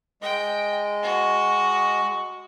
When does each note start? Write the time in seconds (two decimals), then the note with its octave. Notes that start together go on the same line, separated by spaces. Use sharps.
0.22 G#3 D#5 G5
1.03 F#4